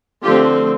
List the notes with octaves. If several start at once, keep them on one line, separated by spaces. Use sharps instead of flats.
D3 F3 A3 C4 F4 G4